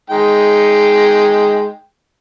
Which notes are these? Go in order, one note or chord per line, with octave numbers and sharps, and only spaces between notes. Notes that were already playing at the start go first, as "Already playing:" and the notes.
G#3 D#4 G5